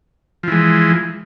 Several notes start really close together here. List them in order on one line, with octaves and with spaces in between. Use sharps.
F3 E3 G#3